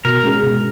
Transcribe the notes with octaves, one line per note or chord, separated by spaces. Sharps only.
B2 A#4
G#3 C#4 G#4
B2